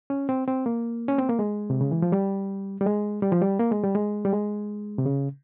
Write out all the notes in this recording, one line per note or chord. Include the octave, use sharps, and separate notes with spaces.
C#4
C4
C4
A#3
C#4
C4
A#3
G#3
C3
C#3
E3
F3
G3
G3
G#3
G3
F3
G3
A#3
G#3
G3
G#3
G3
G#3
C3
C#3